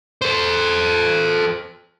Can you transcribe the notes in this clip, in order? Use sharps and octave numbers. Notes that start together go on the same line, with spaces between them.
A4 C5